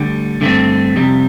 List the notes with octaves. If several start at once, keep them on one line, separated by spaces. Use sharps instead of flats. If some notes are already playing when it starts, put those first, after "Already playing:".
Already playing: D2 D3 G3
G2 D3 A3 C4
F2 C3 G3